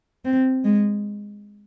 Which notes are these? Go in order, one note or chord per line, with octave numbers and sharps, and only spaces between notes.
C4
G#3